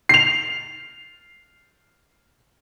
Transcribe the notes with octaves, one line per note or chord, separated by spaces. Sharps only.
C7 F7